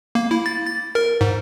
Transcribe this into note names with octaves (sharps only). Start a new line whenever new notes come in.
A#3
E4
A6
A6
A#4
G#2